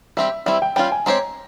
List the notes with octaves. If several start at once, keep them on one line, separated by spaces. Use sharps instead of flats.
G3 C4 G4 E5
G3 C4 E4 E5
G5
G3 C#4 F4 G5
G#5
G#3 C4 G4 C#5 A#5